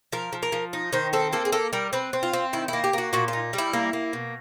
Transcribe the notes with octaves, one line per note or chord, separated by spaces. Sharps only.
F3 A#4
F3
A#4
F3
D#4
D#3 C5
C4 A4
A#3 A4
G#4
A#3 A4
G3 A#4
C4 B4
C4
F4
C4
D#3 E4
A#3 E4
G4
A#3 F#4
A#2 F#4
F4
D#4
G3
E4
A#3
A#3
B2